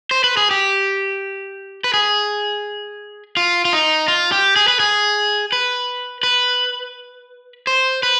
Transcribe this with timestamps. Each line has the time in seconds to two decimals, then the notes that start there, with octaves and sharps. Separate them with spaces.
0.11 C5
0.24 B4
0.37 G#4
0.51 G4
1.84 B4
1.94 G#4
3.37 F4
3.65 F4
3.73 D#4
4.08 F4
4.32 G4
4.56 G#4
4.68 B4
4.80 G#4
5.52 B4
6.23 B4
7.67 C5
8.03 B4